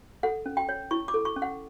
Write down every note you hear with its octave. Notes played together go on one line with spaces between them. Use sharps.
A4 F#5
C#4
G5
C#5
E4 C#6
D6
A4
C#6
C#4
F#5